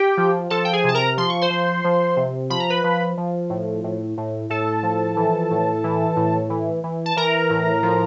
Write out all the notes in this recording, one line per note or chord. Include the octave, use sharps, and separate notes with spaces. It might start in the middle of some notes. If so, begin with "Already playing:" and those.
Already playing: G4 G5
F3
F3 A4 A5
G5
G#4 G#5
C3 A5
A#4 A#5
F3 C6
C#6
C5 C6
F3
F3
C3
F3 B5
A#5
B4 B5
F3
F3
A2
A2
A2
A2 A4 A5
F3
E3
A2
E3
A2
E3
E3
A5
E3 A#4 A#5
A2
F3